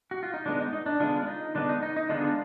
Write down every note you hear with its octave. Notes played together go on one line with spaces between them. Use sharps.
F#4
F4
D#4
D3 G#3 B3 D4
D#4
D#4
D4
D3 G#3 B3 D4 F4
D4
D#4
D3 G#3 B3 D4
D#4
D#4
D#4
D3 G#3 B3 D4 F4